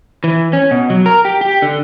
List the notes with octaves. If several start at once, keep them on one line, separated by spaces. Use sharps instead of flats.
E3
C#4
B2
F#3
A#4
G4
G4
D3